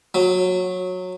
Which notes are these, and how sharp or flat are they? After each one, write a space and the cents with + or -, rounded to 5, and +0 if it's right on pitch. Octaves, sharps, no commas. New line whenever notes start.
F#3 -15